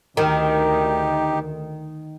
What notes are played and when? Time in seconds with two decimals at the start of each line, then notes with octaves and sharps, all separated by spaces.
0.17 D2 D#3 D#4 G4